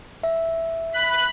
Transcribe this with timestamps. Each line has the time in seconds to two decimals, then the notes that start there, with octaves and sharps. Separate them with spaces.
0.23 E5
0.93 B5 F#6 B6